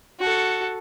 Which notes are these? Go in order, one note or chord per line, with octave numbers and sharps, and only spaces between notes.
F#4 A4